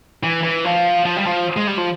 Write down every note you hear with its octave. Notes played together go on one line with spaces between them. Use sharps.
E3
E3
F3
F3
G3
F3
G#3
G3
F3